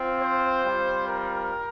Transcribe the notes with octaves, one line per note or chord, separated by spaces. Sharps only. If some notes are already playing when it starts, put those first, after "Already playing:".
Already playing: C4 F4
C5
G3 C4 F4
A#4